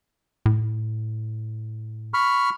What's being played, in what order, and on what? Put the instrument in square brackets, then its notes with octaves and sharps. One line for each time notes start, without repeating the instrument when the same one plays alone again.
[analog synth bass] A2
[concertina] B5 C#6 F6